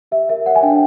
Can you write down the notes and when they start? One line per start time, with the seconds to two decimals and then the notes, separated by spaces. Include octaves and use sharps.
0.12 G4 E5
0.29 A#4 E5
0.46 C#5 F#5
0.56 G#5
0.63 D4 G5